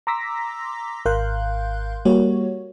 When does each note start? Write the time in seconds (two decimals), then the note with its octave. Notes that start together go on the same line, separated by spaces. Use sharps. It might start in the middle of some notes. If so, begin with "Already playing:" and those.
0.07 A#5 C6 D6 E6 A#6 B6
1.05 G#1 A#4 F5 C6 F#6 G6
2.05 G3 A#3 F#4 C#5